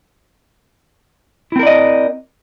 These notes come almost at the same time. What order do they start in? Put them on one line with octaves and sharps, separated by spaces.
E4 C4 A#4 D5 D#5